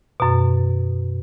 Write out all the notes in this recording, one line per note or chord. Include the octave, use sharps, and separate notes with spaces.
F#2 B2